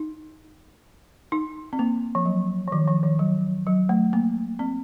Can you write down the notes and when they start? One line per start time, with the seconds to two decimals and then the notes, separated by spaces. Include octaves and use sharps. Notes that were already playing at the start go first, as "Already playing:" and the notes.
Already playing: D#4
1.32 D#4
1.73 C4
1.79 A#3
2.15 F3
2.25 F#3
2.67 F3
2.72 D#3
2.88 F3
3.03 D#3
3.19 F#3
3.67 F#3
3.89 A3
4.13 A#3
4.59 C4